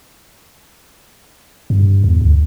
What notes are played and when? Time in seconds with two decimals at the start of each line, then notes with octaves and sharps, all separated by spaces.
1.70 G2
2.04 E2
2.21 D2